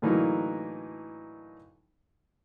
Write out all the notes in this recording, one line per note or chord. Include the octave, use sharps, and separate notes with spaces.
A2 D3 E3 F#3 A#3 D#4